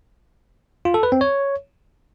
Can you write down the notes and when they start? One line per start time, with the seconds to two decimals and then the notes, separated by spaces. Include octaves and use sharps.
0.85 F4
0.94 A4
1.03 B4
1.12 C4
1.21 C#5